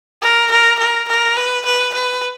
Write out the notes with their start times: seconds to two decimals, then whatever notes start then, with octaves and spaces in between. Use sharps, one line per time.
0.22 A#4
0.51 A#4
0.79 A#4
1.08 A#4
1.36 B4
1.65 B4
1.93 B4